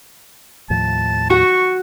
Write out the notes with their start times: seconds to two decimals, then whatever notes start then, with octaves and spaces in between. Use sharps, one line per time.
0.70 D#2 A2 F3 A5
1.30 F#4 C#6